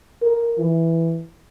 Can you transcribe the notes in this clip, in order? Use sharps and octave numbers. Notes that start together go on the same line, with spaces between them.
A#4
E3